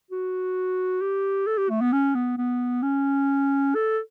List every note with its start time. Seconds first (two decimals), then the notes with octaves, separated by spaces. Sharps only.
0.11 F#4
1.01 G4
1.47 A4
1.58 G4
1.70 A3
1.81 B3
1.92 C#4
2.15 B3
2.38 B3
2.83 C#4
3.75 A4